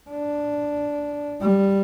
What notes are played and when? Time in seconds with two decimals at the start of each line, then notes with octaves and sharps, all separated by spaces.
0.10 D4
1.41 G3